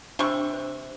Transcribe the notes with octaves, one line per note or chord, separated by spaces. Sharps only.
C3 D4 B5 C#6 E6
C5